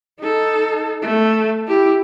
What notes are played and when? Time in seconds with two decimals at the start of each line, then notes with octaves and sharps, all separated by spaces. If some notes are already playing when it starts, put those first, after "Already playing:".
0.20 D#4 A4
1.02 A3
1.68 E4 G4